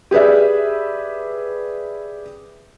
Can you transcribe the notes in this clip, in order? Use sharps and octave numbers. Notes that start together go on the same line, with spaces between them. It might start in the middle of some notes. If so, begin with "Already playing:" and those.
G4 G#4 B4 D5 E5